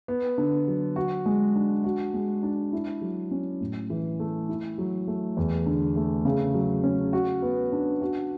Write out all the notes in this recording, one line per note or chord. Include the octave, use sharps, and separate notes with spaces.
B3
D3
F#3
F#4
G#3
D4
F#4
G#3
D4
E4
F#3
C#4
A2
E3
A3
E4
F#3
A3
E2
D3
A3
C#3
F#3
C#4
F#4
B3
D4
F#4